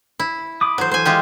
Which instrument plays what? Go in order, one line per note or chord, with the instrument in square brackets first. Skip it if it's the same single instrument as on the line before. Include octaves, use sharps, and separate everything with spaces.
[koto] E4
[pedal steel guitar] B5 D6 D#6
[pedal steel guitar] E3 E4 A4 [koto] F#3 C5
[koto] C5 G#5
G#3 F4 G4